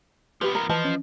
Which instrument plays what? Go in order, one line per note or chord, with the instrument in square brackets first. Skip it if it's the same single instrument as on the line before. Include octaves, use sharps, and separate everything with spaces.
[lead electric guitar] F3 B3 [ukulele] G4 B4
[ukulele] A#4
[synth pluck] E3 [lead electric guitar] F3 [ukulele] B4 D#5 A5
[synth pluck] C#4